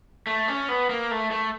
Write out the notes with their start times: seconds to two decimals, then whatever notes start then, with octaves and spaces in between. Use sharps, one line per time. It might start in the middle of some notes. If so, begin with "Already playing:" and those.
0.27 A3
0.48 C#4
0.69 B3
0.90 A#3
1.11 A3
1.31 A3